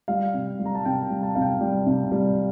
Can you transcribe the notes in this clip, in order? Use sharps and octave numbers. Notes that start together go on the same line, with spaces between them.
G3 F5
C3
G3
A#5
A5
C3 G5
G3
A5
C3 F5
G5
G3
C3
G3